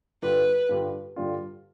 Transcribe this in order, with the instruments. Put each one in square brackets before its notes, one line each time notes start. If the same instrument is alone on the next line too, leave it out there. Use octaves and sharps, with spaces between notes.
[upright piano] G2 D3 G3 D4 F4 [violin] B4
[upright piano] G2 D3 G3 D4 F4
G2 D3 G3 D4 F4